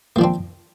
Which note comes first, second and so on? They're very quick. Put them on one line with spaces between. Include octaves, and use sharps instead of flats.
A#3 F3 D4 C4